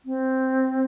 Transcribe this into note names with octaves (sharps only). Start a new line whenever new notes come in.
C4